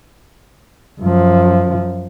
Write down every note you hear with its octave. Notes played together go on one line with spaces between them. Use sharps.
F#2 F3